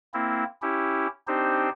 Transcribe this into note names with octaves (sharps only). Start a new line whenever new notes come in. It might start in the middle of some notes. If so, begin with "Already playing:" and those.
A#3 C4 E4
C#4 E4 G4
C4 D4 D#4 G4 C5